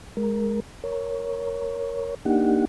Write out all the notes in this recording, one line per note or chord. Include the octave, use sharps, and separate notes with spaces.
G#3 A#4
A#4 C#5
A#3 D4 D#4 G4 F#5